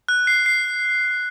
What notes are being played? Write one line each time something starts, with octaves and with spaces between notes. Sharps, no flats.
F#6
C7
C7